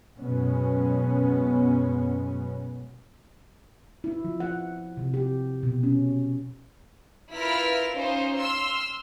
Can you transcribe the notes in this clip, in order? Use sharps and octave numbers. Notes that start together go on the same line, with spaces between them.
F#2 B2 G#3 B3 C#4
E4
F3
F#5
C3
G4
B2
C#4
E4 F4 A#4 B4 F6 B6
C#4 D#4 F4 C5
C6 E6 F6